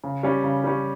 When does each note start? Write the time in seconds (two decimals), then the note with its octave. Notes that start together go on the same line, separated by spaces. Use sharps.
0.04 C#3
0.23 G3 C#4
0.44 C#3
0.64 G3 C#4